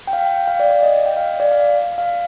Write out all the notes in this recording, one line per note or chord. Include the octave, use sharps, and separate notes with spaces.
G5
F5
G5
G5
F5
D5
D5
D#5
G5
F5
D5
F5
F5